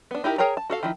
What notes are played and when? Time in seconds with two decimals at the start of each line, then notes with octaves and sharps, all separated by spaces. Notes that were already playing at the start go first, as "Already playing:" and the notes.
0.11 B3 D4
0.24 D#4 E4 G4 A#4
0.38 G#4 A#4 C#5 G5 A#5
0.57 A5
0.70 F#4 A4 F5
0.83 D#3 F3 E4